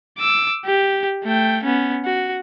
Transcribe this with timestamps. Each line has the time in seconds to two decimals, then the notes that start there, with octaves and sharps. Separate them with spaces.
0.18 D6 E6
0.65 G4
1.24 A3 G5
1.64 B3 C#4
2.05 F#4